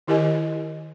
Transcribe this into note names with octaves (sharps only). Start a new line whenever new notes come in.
D#3 E4 G4 A#4 D#5 G#5